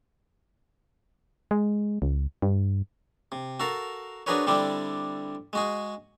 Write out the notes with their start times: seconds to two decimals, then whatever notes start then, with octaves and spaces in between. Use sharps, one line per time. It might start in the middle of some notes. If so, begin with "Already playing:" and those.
1.51 G#3
2.02 C#2
2.42 G2
3.32 C3
3.60 F#4 A4 A#4 F5
4.26 D4 F#4 G#4 A#4 B4 C#5
4.47 D3 G3 C4 D4 E4
5.53 G#3 F#4 G#4